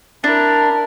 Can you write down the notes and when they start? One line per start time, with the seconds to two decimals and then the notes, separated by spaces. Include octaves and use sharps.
0.24 D4 E4 A#4